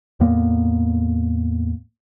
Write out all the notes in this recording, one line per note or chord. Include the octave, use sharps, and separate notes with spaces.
E2 A2 A#3 B3